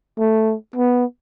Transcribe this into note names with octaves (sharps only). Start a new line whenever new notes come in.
A3
B3